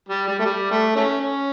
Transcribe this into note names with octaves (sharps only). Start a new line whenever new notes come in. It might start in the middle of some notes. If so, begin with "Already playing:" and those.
G3
G3
A3
G3
A3
A3 C#4
C#4